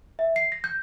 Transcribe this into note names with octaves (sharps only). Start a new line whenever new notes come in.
E5
C7
A#6
G6